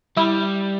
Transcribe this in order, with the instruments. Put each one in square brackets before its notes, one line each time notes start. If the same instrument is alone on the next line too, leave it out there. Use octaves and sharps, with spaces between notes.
[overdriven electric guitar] G3 [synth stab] E4